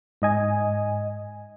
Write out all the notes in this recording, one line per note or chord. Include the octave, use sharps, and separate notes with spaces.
G#2 D#5 G#5